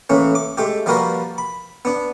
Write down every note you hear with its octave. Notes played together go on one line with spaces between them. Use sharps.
A2 E3 A#3 C#4
D6
G#3 A3 G4
F3 G3 A#3 F#4 A#4 B4
B5
B3 D4